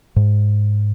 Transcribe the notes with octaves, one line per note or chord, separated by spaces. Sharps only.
G#2